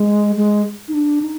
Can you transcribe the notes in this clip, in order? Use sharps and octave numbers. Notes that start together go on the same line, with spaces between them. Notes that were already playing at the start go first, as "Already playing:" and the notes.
Already playing: G#3
G#3
D#4
D4
D#4